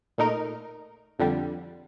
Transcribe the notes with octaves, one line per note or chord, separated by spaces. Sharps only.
A#2 A3 D#4 A#4
F2 D3 G3